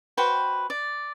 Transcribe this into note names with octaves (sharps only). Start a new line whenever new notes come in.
F#4 B4 C5 G5
D5